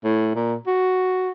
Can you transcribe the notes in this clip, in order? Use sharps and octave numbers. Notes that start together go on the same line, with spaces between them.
A2
A#2
F#4